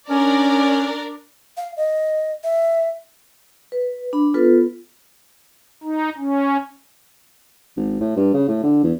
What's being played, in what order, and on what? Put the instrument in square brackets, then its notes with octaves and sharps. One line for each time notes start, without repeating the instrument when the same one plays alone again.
[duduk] C#4 [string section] D4 A#4 D5
[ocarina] F5
D#5
E5
[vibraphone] B4
D4 B5
B3 F4 A4 B4
[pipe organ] D#4
C#4
[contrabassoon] G#1
A2
G2
C#3
A2
D3
E2